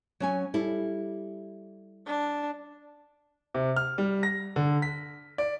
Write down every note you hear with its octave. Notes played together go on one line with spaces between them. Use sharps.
F#3 C#4 G#5
G3 E4 A4
D4
C3
F6
G3
A#6
D3
B6
D5